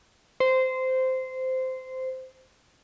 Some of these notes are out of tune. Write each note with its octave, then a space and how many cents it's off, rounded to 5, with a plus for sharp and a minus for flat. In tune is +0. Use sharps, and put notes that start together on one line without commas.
C5 -15